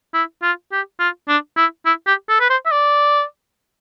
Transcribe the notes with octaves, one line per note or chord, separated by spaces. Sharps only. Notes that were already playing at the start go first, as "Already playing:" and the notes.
E4
F4
G4
F4
D4
E4
E4
G4
A4
B4
C5
E5
D5